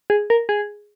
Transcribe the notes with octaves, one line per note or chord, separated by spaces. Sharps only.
G#4
A#4
G#4